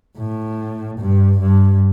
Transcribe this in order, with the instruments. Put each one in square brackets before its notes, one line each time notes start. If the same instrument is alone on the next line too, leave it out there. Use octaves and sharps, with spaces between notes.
[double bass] A2
G2
G2